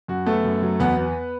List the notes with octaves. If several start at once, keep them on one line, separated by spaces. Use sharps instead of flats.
F#2 F#4
A3 B3 A4
F#2
F#3
E2 B3 B4
B3